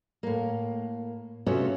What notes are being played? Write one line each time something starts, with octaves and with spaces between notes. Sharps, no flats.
A2 A#3
C3 B3 C#4 F4 F#4 A4